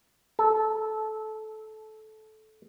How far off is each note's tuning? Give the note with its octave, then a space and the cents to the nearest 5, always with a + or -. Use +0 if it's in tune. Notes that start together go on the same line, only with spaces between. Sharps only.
A4 -15